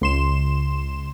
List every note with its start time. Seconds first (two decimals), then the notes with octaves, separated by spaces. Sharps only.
0.01 C#2 C6 E7